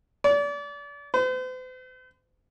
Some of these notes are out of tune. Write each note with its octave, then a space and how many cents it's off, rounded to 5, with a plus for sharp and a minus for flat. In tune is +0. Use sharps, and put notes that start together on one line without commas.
D5 -35
C5 -45